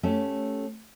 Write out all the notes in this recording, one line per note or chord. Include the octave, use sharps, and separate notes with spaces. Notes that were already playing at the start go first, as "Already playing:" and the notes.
A3 C#4 G4 A4